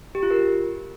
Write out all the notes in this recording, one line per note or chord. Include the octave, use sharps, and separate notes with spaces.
G4
F4
A#4